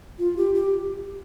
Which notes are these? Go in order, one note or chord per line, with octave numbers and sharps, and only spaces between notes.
F4
G4
G4